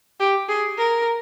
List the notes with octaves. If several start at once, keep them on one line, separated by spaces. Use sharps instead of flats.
G4
G#4
A#4